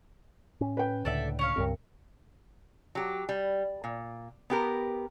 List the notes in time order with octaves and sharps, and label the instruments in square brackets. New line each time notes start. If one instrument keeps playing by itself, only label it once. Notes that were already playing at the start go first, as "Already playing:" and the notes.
[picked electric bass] A2 C#4
[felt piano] B4 G5
[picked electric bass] C#2 A2 D3 [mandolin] A4 D5 E5
[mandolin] C#4 C#5 F5
[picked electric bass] C#2 G2 C4 [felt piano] A#4
[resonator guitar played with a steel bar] F#3 G4
G3
A#2
B3 G4 A#4